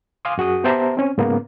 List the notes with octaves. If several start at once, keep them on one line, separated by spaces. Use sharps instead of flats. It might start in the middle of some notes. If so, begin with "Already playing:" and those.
F5 G#5 C6 D6 D#6
F#2 F#4 G#4 D#6
B3 G4 C5 E5 A5 A#5
C4 C#4
G#2 C#3 A#3 B3